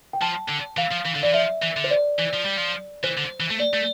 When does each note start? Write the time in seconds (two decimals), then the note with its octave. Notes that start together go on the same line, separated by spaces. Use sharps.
0.13 G5
0.22 F3 A5
0.49 D3
0.78 E3 F5
0.92 F3
1.06 E3
1.16 D3
1.23 E3 D5
1.34 F3 E5
1.63 E3
1.77 D3
1.84 C5
1.91 D5
2.18 E3
2.33 F3
2.45 G3
2.57 F3
3.03 E3 C5
3.17 D3
3.40 E3
3.51 A3
3.60 D5
3.74 A3